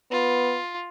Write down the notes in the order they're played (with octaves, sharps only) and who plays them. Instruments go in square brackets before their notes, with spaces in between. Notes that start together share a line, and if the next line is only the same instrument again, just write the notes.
[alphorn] B3 [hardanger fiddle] F4